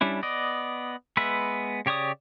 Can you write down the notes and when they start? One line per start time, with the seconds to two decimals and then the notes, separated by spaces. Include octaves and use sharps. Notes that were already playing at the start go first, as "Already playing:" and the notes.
0.01 G3 C#4 D4 E4
0.23 B3 D5 D#5
1.17 G#3 B3 B4 E5
1.86 C#3 G4 C#5 D5 D#6